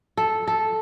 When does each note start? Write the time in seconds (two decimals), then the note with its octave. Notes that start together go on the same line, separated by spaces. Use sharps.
0.17 A4
0.47 A4